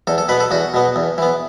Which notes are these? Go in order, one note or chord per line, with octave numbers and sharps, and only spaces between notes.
E2 A4
A4
B2 B3 B4
A4
E2 F#4
B2 B3
E2
E3 B3